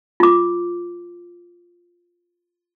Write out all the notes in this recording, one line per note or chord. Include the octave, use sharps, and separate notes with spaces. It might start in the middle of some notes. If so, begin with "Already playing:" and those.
F4 D6